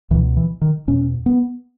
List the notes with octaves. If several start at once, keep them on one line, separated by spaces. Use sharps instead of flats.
C#2 B2 E3
E3
D#3
E2 B2 C#4
B3